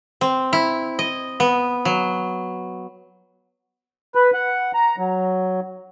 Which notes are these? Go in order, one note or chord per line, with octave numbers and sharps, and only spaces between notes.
C4
E4
D#5
B3
F#3
B4
F#5
A#5
F#3